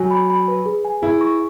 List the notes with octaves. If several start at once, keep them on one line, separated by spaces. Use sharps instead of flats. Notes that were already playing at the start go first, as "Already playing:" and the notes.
Already playing: F#3 G#5
B5
B5
B4
G#4
G#5
E4 G#4
C#6